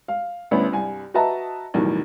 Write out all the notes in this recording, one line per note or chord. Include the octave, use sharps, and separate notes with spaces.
F5
D2 G2 B3 C#4 E4 B5
C2 G2 G#5
F#4 B4 D#5 E5 A5 A#5
B1 E2 A2 D#3 G3